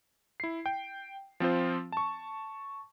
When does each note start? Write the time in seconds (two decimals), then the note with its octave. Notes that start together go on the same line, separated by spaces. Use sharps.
0.40 E4 C7
0.66 G5
1.40 F3 C4 F4 C5
1.92 A5 C#6